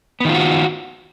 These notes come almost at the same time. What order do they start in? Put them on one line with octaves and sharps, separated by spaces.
B3 D#3 F4 F#4